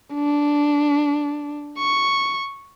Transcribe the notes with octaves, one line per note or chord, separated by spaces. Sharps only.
D4
C#6